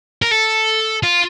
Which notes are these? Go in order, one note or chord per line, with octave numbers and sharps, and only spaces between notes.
A#4
A4
F4